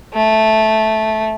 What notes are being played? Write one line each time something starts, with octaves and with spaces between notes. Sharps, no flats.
A3